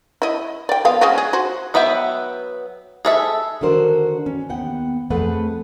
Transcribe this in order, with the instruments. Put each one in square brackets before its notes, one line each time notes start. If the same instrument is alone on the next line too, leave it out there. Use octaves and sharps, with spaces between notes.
[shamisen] E4 D#5
D5 G5
F3 B3 F5
G#3 C#4 F#4
G#4
F#4 C5
[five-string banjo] F#3 B3 B4 E5 G5
G#4 A4 E5
[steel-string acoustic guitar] D3 D#3 D4 F#4 A#4 C5
C#4
D#2 B3 F#5 G5
F2 A3 G#4 B4 F#5